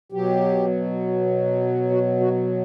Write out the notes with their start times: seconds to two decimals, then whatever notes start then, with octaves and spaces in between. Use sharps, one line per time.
0.12 B2 F#3 G4
1.90 F#4
2.20 F#4